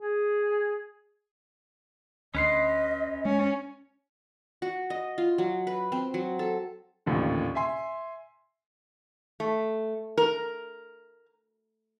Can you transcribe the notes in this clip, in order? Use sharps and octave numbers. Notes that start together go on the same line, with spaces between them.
G#4
D2 C#4 B4 D#5 C6
G#3 C#4
F#4
D#5
F4
F#3
B4
C4
F#3
A4
A1 D#2 A#2 D3
E5 G#5 C6
A3
A#4